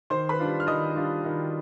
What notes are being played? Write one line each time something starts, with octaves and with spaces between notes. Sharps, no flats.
D#3 C5 C6
B4 B5
G3 D4 F4
F6
D#3 D#5 D#6
G3 D4 F4
D#3